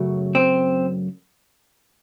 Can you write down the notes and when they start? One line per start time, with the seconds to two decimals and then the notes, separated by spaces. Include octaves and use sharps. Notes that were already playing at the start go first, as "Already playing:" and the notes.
Already playing: F#2 C#3 F#3 A3
0.35 C4